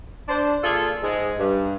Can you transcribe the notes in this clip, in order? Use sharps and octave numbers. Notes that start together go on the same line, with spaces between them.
D4 C5
A#2 F4 G#4 A4
G#2 G#3
G2